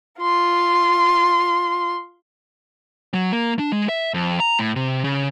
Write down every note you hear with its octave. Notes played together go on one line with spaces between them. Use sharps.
F4 C6
F#3
A#3
D4
G#3
E5
F2
A#5
A2
C3
C#3